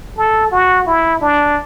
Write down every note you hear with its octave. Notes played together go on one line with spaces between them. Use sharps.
A4
F#4
E4
D4